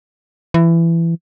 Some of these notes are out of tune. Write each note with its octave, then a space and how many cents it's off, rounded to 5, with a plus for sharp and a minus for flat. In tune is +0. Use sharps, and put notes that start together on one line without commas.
E3 +20